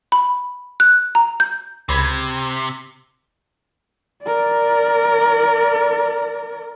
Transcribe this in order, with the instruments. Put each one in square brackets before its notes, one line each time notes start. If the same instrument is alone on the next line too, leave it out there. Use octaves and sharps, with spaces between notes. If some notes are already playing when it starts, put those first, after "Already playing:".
[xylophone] B5
F#6
A#5
G6
[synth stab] C#2 B5 G#6 [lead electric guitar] C3
[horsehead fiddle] A#4 D5